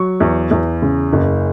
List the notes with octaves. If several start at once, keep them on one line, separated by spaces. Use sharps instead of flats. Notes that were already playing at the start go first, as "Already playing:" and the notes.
Already playing: F#3 C#6
E2
E2
C#3
F#1